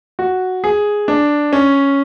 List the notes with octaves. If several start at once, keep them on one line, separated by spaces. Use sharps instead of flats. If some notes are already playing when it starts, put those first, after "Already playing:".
F#4
G#4
D4
C#4